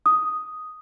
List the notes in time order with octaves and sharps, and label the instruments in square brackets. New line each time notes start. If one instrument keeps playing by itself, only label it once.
[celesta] D#6